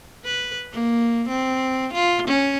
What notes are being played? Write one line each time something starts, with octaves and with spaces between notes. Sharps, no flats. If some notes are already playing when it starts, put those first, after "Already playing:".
B4
A#3
C4
F4
C#4